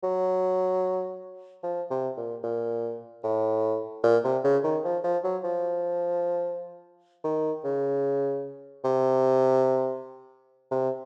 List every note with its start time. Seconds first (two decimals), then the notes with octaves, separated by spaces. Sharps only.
0.04 F#3
1.64 F3
1.91 C3
2.17 A#2
2.44 A#2
3.24 A2
4.04 A#2
4.24 C3
4.44 C#3
4.64 D#3
4.85 F3
5.04 F3
5.24 F#3
5.44 F3
7.24 D#3
7.65 C#3
8.84 C3
10.71 C3